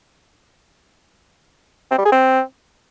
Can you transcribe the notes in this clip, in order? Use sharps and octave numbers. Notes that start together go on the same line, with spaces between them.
C4
G3
G#4
C4